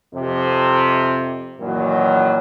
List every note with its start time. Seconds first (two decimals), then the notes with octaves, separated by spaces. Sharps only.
0.14 F2 C3
1.60 F#2 A#2 D#3 E3 F#3